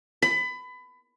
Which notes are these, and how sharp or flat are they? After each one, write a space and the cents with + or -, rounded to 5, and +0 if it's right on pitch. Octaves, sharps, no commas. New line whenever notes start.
B5 +25